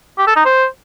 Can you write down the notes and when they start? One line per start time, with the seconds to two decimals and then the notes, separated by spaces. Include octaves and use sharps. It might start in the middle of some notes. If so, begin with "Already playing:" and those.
0.18 G4
0.27 A4
0.36 D#4
0.45 C5